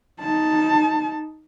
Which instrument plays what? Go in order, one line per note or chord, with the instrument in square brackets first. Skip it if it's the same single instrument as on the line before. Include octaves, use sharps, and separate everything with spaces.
[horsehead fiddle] D#4 A5